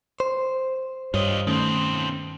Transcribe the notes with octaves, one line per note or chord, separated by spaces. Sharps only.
C5
G2 F4 C#5 D#5
B2 D#3 A3 C4 C#4